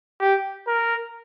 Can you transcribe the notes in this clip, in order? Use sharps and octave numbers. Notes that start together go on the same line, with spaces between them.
G4
A#4